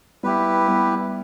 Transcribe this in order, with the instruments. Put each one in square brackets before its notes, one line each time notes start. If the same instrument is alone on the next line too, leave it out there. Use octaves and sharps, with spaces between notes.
[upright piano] G3 B3 [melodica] E4 G4 B4
[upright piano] G3 B3